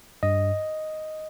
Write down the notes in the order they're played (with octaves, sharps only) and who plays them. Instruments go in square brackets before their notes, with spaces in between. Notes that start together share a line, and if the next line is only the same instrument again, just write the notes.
[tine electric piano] G2 D#5